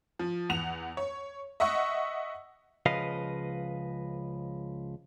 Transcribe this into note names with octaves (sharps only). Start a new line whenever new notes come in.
F3
E2 F#5 F7
C#5
D#5 E5 F#5 C#6
C#2 C#3 F3 B4 D#5 F5